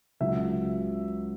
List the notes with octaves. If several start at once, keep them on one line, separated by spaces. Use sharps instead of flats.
C#2 C#3 F#3 C#4 E5